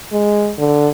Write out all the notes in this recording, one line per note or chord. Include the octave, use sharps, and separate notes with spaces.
G#3
D3